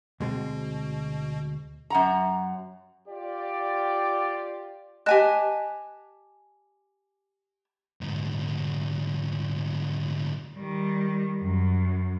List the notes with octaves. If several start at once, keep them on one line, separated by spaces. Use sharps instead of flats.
D2 B2 G#3 C4
F#2 F#5 A#5
F4 G4 D5
G4 D#5 G#5 A5 F#6
D2 G#2
D#3 G3
F#2